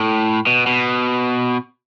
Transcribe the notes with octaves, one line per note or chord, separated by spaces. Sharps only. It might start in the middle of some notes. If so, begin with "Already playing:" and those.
Already playing: A2
B2
B2